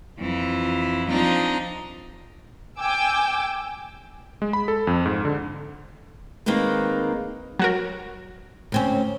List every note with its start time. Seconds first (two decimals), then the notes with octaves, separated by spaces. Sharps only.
0.18 F2 E3 E4 F4
1.08 F3 C4 D4 D#4 F4
2.80 G5 G#5 D6 E6
4.42 G#3
4.53 B5
4.68 A4
4.87 F2
5.06 G#2
5.25 D3
6.46 D#3 G#3 A#3 C4 D#4 B4
7.59 F#3 F#4 A#4
8.72 D2 C4 C#4